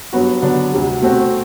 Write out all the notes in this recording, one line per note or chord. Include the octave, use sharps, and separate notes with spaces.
G2 F#3 B3 F#4
D3 F#3 B3 D4
D2 C3 G3
B2 A3 C4 F#4